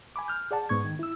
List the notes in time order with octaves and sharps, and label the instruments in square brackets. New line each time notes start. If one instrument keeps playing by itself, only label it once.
[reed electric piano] G#5 B5 D6
F6 G6
G#4 D5 F#5 A5
G#2 B3 C#6 G#6
D#3
E4 E6